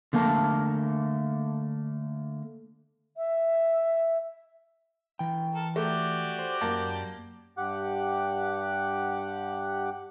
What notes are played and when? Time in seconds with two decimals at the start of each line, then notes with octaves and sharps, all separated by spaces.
0.13 D3 A3 A#3 A#4 A5
3.17 E5
5.19 E3 G5
5.54 A4 A#4
5.76 A3 F#4 G4 D5
6.39 C5
6.61 F#2 A#3 A5
7.58 G2 G4 F#5 D6 F#6